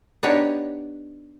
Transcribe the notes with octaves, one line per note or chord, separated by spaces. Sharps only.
B3 D4 D#4 G4 C#5